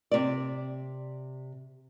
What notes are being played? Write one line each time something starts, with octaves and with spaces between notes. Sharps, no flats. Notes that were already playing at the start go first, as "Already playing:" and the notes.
C3 D5